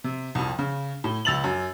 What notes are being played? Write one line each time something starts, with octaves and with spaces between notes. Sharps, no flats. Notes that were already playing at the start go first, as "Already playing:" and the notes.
C3
C2 F2
C#3
A2
C#2 E6 A6 F7 F#7
F#2